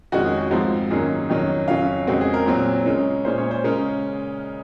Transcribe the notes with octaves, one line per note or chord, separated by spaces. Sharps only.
F2 D#3 G#3 C#4 F#4
G#4
F#4
G#2 F3 C4 F#4
F#2 D#3 F#3 A#3 C#4 G#4
F2 D#3 F#3 C#4
F2 C#3 F#3 C#4 F5
F2 C#3 G#3 C4 F#4
G#4
A#4
A#2 F#3 C4
C#3 G#3 C#4
A#2 G#3 C#4 C5
C#5
C5
C#3 G#3 C#4 A#4